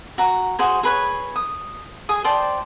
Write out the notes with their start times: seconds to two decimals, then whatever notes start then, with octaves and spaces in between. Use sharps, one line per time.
0.18 F#4 A#5
0.59 F#4 G#4 C5 G#5
0.83 G#4 B4 C#5
1.36 D#6
2.09 G#4 G#5 D#6
2.24 C5 D5 G5 A5